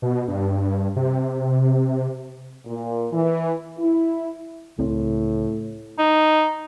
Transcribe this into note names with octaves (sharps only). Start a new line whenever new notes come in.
B2
G2
C3
A#2
E3
E4
C#2 A2 C4
D#4